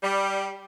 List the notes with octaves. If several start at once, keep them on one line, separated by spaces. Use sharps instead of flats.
G3